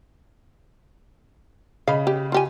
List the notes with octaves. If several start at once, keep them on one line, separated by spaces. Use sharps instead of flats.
C#3 D#5 F5 B5
G4
F4 G4 G#5